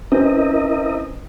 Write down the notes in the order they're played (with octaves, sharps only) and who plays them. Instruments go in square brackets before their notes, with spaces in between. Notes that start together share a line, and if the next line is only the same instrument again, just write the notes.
[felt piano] C4 C#4 B4 [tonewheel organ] E4 A#4 D#5